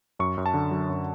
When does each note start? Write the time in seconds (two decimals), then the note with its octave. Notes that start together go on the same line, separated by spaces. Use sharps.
0.19 F#2 C#6
0.38 F#2
0.46 A5
0.54 D3
0.71 F#3
0.90 F#2